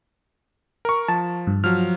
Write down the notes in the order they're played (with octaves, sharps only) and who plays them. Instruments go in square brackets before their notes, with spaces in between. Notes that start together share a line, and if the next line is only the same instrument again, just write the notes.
[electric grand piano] A#4 C#6
[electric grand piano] F3 [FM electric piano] A5
[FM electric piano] G2
[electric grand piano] F3 F#3 [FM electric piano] F6